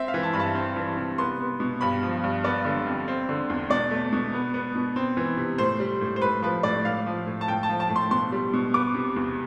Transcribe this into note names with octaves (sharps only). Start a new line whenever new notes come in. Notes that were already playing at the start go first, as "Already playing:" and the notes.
Already playing: C4 E5
F5
E3
A5
G2 B5
A5
C4
E3
C3
B3 C6
B3
B2
G2 B5
F3
G2
B3 D5
D3
F2
C4
D3
E2
B2 D5
A3
B2
B3
B3
B2
C4
E3
C3
A2 C5
G3
A2
C5
A2 B4
F3 B4
A2 D5
A2 F5
F3
A2
A5
A2 G5
A5
F3
A5
A2
C6
B2 C6
G3
B2
B3 D6
C3
E2